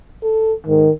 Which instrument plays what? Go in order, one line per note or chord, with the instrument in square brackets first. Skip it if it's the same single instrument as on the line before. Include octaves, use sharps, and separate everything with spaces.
[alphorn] A4
[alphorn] G#2 [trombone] D#3